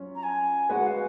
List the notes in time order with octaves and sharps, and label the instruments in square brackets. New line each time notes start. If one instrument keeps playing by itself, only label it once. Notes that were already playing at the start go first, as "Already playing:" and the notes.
Already playing: [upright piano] F#3 C#4 F4
[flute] A#5
G#5
[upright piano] G#3 B3 F#4 B4 [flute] F#5
[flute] F5